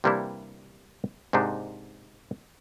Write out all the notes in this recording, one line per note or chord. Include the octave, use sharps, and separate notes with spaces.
C3 E3 G3 A#3 D4 E4
G#2 C3 A#3 D4 D#4